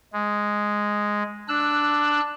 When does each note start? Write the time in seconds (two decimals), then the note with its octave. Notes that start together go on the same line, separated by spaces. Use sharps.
0.13 G#3
1.48 D4 E6 F#6